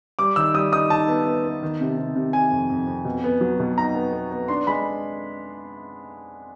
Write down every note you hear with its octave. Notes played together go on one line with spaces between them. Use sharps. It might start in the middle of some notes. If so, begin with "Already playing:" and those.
G3 D6
D#3 E6
G3 D#6
D#4 D#6
D#4 A5
B3
B3
B3
D#3
C3
C3
C3
C3 G#5
F2
F2
F2
B2
B3
F#3
B2
D#4 A#5
B3
B3
B3
D4 C6
G#3 B5